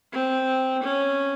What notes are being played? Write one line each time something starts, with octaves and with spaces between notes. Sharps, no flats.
C4
C#4